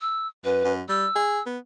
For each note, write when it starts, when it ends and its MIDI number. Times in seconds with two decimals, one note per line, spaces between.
0.01 0.28 88
0.45 0.61 42
0.45 0.72 71
0.64 0.82 42
0.89 1.06 55
0.89 1.43 88
1.16 1.40 68
1.46 1.58 59